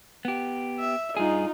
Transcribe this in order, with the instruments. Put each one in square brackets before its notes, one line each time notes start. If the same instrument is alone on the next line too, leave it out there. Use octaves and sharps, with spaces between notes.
[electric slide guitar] B3 G4
[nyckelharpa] E5
[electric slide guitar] G2 G#4 [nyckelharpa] D#4 F4